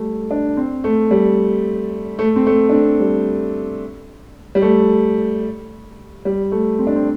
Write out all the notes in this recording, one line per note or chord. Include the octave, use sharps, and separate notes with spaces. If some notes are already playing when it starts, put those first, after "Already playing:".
Already playing: G3 A3
D4
C4
A3
G3
A3
C4
A3
D4
C4
G3
G3
A3
G3
A3
C4
D4
C4